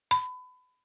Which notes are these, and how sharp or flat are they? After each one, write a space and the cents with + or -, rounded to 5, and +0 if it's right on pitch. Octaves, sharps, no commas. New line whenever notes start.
B5 +30